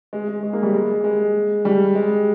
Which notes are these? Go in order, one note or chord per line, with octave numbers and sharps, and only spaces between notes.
G#3
G#3
G#3
A#3
G3
G#3
G#3
G3
G#3